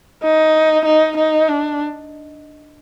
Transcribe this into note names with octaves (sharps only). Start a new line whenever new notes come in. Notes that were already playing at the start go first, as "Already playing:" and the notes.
D#4
D#4
D#4
D4